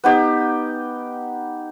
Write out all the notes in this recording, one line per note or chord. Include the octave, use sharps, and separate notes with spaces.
B3 D#4 G4